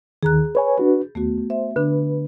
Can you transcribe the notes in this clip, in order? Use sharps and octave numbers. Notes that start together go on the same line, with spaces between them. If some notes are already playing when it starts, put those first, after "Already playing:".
D#2 D#3 G#4 A#5 F#6
B4 C#5 G#5 B5
D4 F#4 B4
D#2 A3 B3 F#4
C5 E5
D3 D4 B4